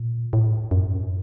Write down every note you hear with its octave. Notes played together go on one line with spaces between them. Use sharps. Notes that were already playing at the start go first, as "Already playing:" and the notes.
Already playing: A#2
A2
F#2